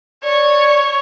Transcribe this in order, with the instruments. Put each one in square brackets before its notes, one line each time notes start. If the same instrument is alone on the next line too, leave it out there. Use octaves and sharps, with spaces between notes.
[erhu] C#5 [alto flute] D5